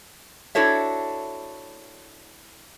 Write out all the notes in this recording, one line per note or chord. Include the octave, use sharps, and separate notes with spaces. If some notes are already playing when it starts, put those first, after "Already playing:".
D4 E4 F#4 A4 C#5 E5